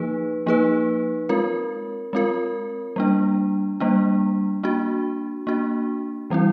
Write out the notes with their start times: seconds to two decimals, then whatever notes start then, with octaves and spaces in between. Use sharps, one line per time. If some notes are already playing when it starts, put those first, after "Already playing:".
Already playing: F3 A#3 D#4 G#4 B4
0.46 F3 A#3 D#4 G#4 B4
1.29 G#3 C4 F4 A#4
2.13 G#3 C4 F4 A#4
2.96 G3 A#3 D4
3.80 G3 A#3 D4
4.63 A#3 D4 F#4
5.47 A#3 D4 F#4
6.30 E3 G3 C4 E4